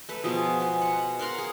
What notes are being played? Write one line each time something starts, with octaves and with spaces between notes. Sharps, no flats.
A3 B4
B2 F3 G#4
G#3 B4
F#5
A#4 F5 F#5 C6
G#4